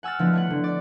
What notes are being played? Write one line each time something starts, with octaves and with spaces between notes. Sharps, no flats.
F#5 G#5 E6 F6 A6
D3 F3 G#3 A3 B3 E4
A3 C#5 F#5
D3
D5